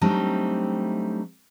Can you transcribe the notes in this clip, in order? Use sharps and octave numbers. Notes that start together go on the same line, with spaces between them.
F#3 G3 A3 C4 D4 D#4